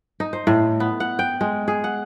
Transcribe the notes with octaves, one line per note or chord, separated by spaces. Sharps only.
D#4
C5
A2
B3
F#5
G5
G#3
G#4
F#5